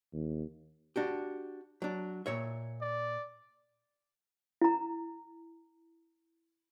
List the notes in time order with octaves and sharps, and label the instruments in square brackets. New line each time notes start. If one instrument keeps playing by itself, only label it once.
[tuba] D#2
[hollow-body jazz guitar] D4 F#4 G4
F#3 D4
A#2 C#5 E5
[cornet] D5
[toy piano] E4 A#5